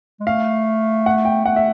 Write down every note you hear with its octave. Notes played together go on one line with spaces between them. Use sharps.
G#3
A3 F5
F#5
G5
A3 F#5
E5